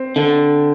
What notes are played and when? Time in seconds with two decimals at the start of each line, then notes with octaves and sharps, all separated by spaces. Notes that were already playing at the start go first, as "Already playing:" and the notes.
Already playing: C4
0.16 D3